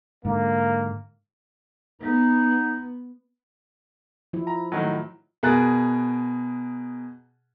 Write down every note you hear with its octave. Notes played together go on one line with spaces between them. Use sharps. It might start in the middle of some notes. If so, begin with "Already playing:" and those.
G#2 D3 A#3
B3 D#4
F3 E4
A#5
A2 D#3 F#3
B2 G#4 A#4 F#6 A6